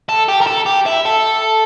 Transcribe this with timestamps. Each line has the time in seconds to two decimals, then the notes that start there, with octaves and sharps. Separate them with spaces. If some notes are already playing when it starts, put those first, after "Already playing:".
0.09 A4
0.28 G4
0.41 A#4
0.47 A4
0.66 G4
0.86 E4
1.05 A4